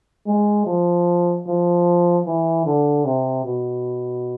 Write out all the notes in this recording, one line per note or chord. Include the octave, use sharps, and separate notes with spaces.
G#3
F3
F3
E3
D3
C3
B2